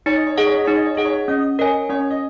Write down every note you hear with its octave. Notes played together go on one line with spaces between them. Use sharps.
D#4 C#5
D#5
C#5
G#4 D#5 F#5
C#5
D#5
D#4 C#5
D#5
C#5
G#4 D#5 F#5
C#5
C#4 D#5
A#4 C#5 D#5 G#5
C#4 C#5
D#5